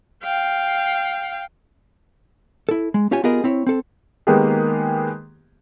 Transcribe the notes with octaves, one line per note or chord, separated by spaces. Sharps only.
F5 G5
E4 A4
G#3
C#4 F4 G4 C#5 G#5
B3 F4 G4 G#4 A#4 D#5
C4 E4 C#5
C4 A4
D#3 G#3 A#3 B3 G4 G#4